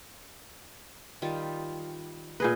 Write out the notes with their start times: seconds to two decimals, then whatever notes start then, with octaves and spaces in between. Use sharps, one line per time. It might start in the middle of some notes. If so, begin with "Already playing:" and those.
1.22 D#3 G3 F4
2.40 A#2 G#4 B4 D#5